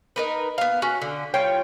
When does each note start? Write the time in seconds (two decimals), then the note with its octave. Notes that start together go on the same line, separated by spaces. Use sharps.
0.16 D#4 A#4 B4
0.58 B3 F5
0.82 C#4 F#4
1.02 D3
1.34 G3 F4 C#5 G5